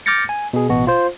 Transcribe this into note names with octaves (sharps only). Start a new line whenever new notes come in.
D6 F6 G6 A6 A#6 C#7
G#5
B2 G#4
A1 B2 F#4
F4 C5